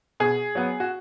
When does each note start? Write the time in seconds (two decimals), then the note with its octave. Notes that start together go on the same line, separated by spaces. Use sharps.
0.20 B2 G#4
0.55 F#3 B3
0.80 F#4